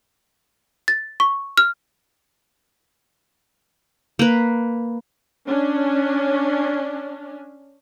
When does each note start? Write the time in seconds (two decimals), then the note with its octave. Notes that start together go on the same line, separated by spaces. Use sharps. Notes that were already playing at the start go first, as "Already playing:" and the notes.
0.88 A6
1.20 C#6
1.57 F6
4.19 A#3 B4
5.47 C#4 D4